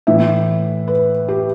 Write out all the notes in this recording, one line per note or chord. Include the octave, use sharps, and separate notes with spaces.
A2 E3 E5
B4
G4